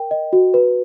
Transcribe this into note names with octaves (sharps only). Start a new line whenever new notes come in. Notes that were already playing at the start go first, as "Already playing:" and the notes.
Already playing: A#4 G5
D#5
F#4
B4